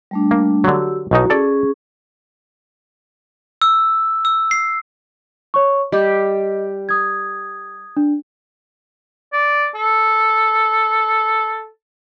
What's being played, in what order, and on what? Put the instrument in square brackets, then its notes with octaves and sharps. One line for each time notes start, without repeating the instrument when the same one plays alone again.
[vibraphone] G3 A3 D4
[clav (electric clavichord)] A#3
[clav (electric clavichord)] D3 F#3 [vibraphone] F#4 G4 E6
[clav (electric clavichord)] B1 B2 D#4 [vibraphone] E4 F#4 A#5
[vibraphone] C#4 G#4 C#6 [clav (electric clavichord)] A4 D5
[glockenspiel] E6
E6
C7
[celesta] C#5 C#6
[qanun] G3 G4 [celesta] D#5
[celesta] D#6 G#6
D4
[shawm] D5
A4